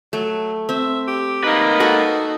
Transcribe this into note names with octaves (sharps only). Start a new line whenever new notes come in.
F#3 A3
C4 E5
G4
A#3 D#4 B4
F#4 A4 F#5